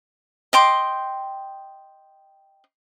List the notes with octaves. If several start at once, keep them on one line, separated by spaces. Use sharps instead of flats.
D#5 G5 C6 D6